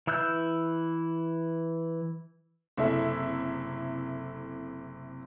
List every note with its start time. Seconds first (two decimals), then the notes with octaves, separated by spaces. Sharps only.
0.07 E3 E4 E6 F#6 G6
2.77 F#1 C3 E4 A4 E5